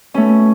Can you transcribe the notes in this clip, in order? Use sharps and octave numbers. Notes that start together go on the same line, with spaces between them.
B2 A3 C#4